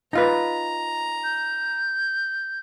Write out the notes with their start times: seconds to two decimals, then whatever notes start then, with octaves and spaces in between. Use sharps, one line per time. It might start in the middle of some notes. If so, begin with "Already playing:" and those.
0.13 D#4 F4 B4 A#5
1.24 G6